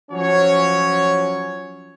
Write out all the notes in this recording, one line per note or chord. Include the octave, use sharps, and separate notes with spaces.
F3 F#3 C#4 C#5